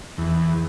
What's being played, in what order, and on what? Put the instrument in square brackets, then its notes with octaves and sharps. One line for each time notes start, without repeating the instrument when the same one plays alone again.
[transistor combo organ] E2